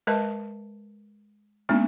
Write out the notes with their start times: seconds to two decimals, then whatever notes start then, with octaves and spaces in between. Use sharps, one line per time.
0.07 G#3 A#4 B4 D#5 A5
1.69 G#3 A#3 B3 C#4 D4 E4